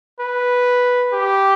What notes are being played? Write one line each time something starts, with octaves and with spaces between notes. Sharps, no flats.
B4
G4